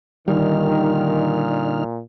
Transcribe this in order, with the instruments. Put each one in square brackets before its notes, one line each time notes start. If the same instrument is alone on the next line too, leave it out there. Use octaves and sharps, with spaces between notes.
[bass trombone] A#2 [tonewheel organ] D3 D#4 F6 [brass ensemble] D#3 [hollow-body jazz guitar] G3